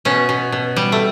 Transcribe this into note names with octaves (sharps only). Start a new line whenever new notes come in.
B2 C#4
B2
B2
G3
A3